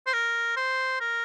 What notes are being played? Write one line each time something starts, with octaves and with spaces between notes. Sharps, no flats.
C5
A#4
C5
A#4